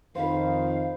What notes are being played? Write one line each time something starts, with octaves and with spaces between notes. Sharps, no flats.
F2 D#3 C5 F5 B5